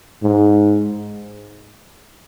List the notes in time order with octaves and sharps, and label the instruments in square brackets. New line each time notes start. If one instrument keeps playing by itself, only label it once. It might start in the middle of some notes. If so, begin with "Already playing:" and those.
[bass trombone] G#2